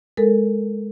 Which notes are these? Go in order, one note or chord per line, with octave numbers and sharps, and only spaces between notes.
G#3 A4 A#4